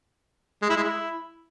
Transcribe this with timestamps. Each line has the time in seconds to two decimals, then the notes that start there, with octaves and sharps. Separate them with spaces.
0.62 G#3
0.69 E4
0.76 G#3
0.83 E4